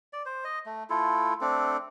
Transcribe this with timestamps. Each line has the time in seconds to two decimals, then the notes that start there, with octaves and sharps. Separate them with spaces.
0.13 D5
0.26 C5
0.44 D#5
0.66 A3
0.90 A3 E4 F4 A4
1.41 A3 C4 D4 A4